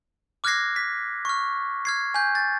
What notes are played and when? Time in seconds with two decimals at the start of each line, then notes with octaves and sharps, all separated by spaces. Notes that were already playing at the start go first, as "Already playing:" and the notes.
0.44 D6 F6 F#6 G#6 A#6 C7
0.76 B6
1.25 C#6 F6
1.85 F6 G#6 C7
2.14 G#5 G6
2.35 A6